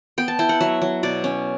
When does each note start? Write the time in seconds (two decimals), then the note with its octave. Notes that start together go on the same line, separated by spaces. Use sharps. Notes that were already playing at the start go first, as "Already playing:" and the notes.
0.18 B3 G5
0.28 A5
0.39 E4 G5
0.49 F#5
0.61 F#3 E5
0.82 F#3
1.03 B2 D5
1.24 C#4